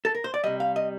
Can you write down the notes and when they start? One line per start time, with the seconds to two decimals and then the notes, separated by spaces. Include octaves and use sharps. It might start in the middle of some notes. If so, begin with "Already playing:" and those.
0.05 A4
0.15 A#4
0.24 C5
0.34 D5
0.44 C3 G3 D#5
0.60 F5
0.76 D#5